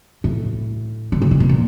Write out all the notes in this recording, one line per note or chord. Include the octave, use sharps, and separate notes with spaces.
A2
D3
C#3
C3
B2
A#2